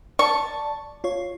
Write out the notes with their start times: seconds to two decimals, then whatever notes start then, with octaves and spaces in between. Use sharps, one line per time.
0.19 D5 A5 C#6
1.04 F4 C#5